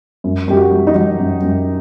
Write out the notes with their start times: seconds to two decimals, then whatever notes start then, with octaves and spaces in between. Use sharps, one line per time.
0.24 F#2
0.48 F#2 G4
0.56 F#4
0.71 F#3
0.87 D#4
0.95 F#3
1.19 F#2
1.42 F#2